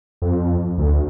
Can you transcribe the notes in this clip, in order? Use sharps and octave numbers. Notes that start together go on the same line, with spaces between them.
F2
D2